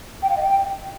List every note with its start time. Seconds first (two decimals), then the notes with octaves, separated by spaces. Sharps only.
0.22 G5
0.29 F5
0.36 D#5
0.43 G5